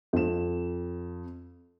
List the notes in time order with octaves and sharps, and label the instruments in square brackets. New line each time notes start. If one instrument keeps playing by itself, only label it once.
[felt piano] F2 E7